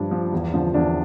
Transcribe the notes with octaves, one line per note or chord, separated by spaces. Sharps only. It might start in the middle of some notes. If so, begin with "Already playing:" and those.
Already playing: G2 F3 D4
F3
E2
D3 F3
E2 D4